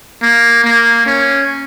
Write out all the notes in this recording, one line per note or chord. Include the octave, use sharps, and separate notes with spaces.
A#3
A#3
C#4